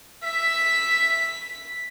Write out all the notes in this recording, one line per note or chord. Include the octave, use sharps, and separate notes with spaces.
E5 B6